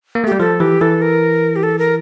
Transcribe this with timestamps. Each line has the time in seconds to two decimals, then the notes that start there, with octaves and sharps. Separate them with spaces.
0.15 A#3
0.24 A3 G4
0.32 G3
0.40 F3 A4
0.60 E3 G4
0.81 E3 A4
1.02 A#4
1.56 G4
1.63 A4
1.79 A#4